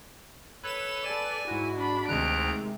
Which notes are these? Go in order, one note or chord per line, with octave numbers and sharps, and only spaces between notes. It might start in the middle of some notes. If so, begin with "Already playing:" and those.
A4 B4 C#5 E7
A4 D5 G#5
G#2 E4 F#4
D4 B5
D2 C3 D#3 G#3 A#5 F#6 D7